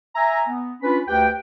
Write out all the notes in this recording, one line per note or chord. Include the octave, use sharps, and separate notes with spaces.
E5 G#5 A#5
B3
C#4 D4 F4 B4 B5
D2 G4 B4 G5